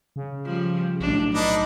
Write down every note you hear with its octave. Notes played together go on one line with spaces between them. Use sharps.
C#3
F3 G3
B1 A2 D4
D4 D#4 B4